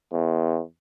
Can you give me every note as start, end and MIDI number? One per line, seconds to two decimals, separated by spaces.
0.12 0.61 40